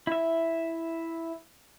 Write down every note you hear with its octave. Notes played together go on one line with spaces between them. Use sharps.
E4 E5